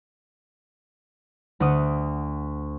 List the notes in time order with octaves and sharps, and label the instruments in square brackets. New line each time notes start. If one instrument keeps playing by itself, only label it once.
[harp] D2 F#5 D#6